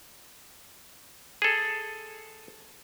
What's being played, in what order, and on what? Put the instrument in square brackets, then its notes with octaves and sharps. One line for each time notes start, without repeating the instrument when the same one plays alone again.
[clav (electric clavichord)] G#4 A4